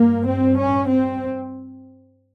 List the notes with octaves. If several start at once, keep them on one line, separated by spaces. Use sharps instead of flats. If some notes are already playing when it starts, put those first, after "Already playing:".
Already playing: G2 A#3
C4
C#4
C4